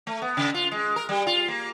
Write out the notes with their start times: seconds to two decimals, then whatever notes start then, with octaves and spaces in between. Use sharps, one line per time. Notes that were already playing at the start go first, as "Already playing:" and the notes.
0.07 A3
0.22 B3
0.37 C#3
0.54 F4
0.72 G#3
0.96 A#4
1.09 G3
1.27 F4
1.48 A#3